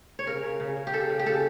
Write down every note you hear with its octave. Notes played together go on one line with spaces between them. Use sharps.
C#5
C#3 A#4
C#3
C#3
C#3
G4
C#3 A4
C#3
G4
C#3 A4